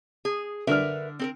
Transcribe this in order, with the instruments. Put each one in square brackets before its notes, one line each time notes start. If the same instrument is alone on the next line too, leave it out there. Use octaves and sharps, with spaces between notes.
[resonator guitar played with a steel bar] G#4
[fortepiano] D3 D4 F6 [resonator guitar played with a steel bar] A#4 B4 E5
[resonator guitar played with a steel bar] C4 A4 A#4